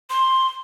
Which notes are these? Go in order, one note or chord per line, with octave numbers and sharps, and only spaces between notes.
C6